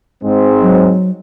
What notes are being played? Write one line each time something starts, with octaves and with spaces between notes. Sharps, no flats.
G#2 G#3 C4
F#3